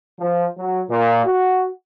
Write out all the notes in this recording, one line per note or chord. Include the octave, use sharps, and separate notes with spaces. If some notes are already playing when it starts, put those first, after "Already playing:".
F3
F#3
A#2
F#4